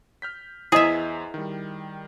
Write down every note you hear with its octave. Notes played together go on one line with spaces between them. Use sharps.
F6 G6 B6
E2 E4 G#4 C5 D#5 E5 G#5
D#3 G3